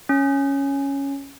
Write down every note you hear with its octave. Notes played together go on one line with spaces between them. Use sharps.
C#4